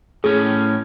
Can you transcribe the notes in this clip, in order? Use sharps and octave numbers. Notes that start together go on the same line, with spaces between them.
A2 C#4 G#4